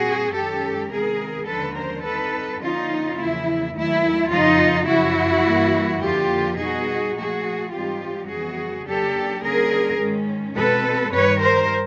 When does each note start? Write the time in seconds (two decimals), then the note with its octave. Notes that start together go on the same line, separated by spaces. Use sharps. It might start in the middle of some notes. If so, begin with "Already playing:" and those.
Already playing: A#2 G3 C4 F#4 G#4
0.34 F#2 D#3 G#3 C#4 G4 A4
0.91 C3 D#3 G#3 B3 G#4 A#4
1.47 D#2 D3 F3 G#3 C#4 A4 B4
1.76 A#4 C5
2.04 D3 G3 C4 D#4 A4 B4
2.61 D3 F3 A#3 C#4 D#4 F4
3.18 E2 C#3 F3 A#3 E4
3.75 D#2 D#3 F#3 A3 E4
4.31 F2 C#3 F3 D#4 F4
4.88 F#2 C#3 F3 E4 F#4
5.45 G2 E3 G3 A#3
6.02 F2 D3 F3 A#3 F4 G4
6.59 B2 G3 B3 D#4 F#4 G#4
7.16 A#2 F3 A3 F#4 G#4
7.72 G#2 E3 G3 C4 D#4 F4 G4
8.30 F2 C#3 E3 G3 B3 F#4 G#4
8.86 C#3 F#3 A#3 D4 G4 A4
9.43 D3 G3 A#3 C#4 G#4 A#4
9.99 G#2 D#3 G#3 C#4
10.56 B2 G#3 C4 A4 B4
11.13 G2 D#3 G3 B4 C#5
11.42 A#4 C5